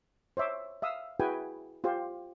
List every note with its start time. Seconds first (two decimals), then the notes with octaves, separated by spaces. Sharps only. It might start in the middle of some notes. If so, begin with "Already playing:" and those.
0.37 C5 C#5 E5 D6
0.82 E5 F5 D#6 E6
1.20 E4 F#4 G#4 B4 G5 G#5
1.84 F4 G4 C5